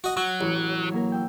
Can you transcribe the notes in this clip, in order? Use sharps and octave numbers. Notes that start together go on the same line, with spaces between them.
F#4 D#5
F#3 F#4
A1
F#3 A#3 A#4
G5 E6